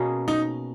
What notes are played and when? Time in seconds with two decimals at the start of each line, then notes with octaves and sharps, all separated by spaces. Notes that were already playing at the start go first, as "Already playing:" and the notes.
Already playing: B2 A#3 C#4 G#4
0.28 D#4